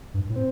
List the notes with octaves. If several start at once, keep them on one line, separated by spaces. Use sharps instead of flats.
G2
A2
C4